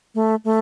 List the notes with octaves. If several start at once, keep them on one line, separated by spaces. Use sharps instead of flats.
A3
A3